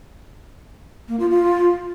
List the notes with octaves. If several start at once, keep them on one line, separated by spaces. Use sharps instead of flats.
A#3
F4
F4